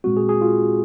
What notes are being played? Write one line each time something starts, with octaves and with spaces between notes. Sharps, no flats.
A#2 G#3 C4 F#4
G#4
G#4
F4